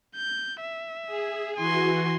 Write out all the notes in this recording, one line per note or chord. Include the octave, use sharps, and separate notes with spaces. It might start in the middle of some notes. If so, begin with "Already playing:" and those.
G6
E5
G#4
E3 F#4 G#5 C6